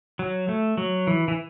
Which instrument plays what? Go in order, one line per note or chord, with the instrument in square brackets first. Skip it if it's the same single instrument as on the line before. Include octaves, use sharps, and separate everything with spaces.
[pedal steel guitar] F#3
A3
F#3
E3
E3